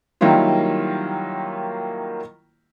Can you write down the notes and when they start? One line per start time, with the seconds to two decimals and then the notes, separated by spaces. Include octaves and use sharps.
0.21 D#3 F#3 G3 A#3 E4 F4